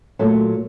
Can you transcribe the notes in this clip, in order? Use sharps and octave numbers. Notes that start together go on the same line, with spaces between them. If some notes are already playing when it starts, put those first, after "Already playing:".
A#2 F#3 A3